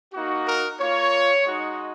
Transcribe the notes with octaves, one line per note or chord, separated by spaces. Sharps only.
A#3 D#4 F#4
A#4
A#3 F4 C#5
G#3 D#4 F#4